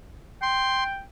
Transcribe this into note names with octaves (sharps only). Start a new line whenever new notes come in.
G5 C6